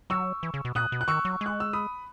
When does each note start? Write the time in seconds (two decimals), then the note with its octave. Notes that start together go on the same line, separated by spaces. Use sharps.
0.10 F#3 C#6 E6
0.43 E3
0.54 C#3
0.65 B2
0.75 A#2 D#6 F#6
0.92 B2
1.01 F#6
1.08 D#3 C#6 E6
1.25 F#3
1.41 G#3
1.46 F#6
1.60 E6
1.73 B5 D#6